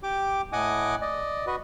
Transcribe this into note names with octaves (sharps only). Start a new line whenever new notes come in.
G4 G5 D6
A2 D#5 F#5 G#5 D6 D#6
D5 D#5
F#4 B4 D#5